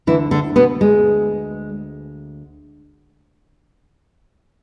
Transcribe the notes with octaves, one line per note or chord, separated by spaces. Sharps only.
D2 D3 E3 E4
D3 D4
B2 B3
G#3